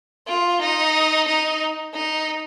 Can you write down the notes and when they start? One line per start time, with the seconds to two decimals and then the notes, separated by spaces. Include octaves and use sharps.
0.27 F4
0.60 D#4
1.27 D#4
1.94 D#4